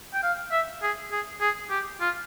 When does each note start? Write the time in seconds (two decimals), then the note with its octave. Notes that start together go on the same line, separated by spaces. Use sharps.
0.14 G5
0.23 F5
0.52 E5
0.82 G#4
1.11 G#4
1.41 G#4
1.70 G4
2.01 F4